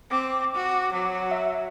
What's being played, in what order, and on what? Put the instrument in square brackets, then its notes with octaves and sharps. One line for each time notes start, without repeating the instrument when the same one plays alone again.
[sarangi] C4 [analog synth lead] D6
[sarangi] F#4
F#3
[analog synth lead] E5